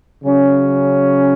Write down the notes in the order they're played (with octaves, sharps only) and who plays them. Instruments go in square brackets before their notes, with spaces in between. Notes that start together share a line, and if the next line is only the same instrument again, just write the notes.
[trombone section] C#3 F#3 C#4